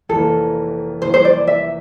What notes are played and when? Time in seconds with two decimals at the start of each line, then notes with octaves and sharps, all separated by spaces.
0.09 F1 F2 E3 A#3 E4 A4
1.02 F1 F2 E3 A#3 E4 C5
1.14 C5
1.25 D5
1.47 E5